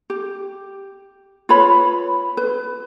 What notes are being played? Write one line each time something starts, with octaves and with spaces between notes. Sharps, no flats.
G4
F4 B4 C#5 B5
B4